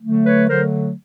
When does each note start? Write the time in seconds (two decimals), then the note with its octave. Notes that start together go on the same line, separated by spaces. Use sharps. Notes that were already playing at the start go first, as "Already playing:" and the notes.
0.02 D3 F#3 A3
0.25 B4 C#5
0.48 D3 F#3 A3 A#4 C5